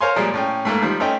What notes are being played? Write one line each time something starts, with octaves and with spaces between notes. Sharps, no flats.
A#4 C5 C#5 F5 G#5 C6
A#2 F3 G3 G#3 A#3
A2 C#4 G5
G#2 A3 A#3
D#3 F3 G3
A3 C#4 C5 D#5 G5